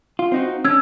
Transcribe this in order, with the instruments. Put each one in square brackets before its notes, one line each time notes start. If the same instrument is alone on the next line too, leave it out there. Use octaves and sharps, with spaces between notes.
[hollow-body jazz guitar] F4
C4 D#4 F#4
[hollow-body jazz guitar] C#4 D4 [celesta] E6 G#6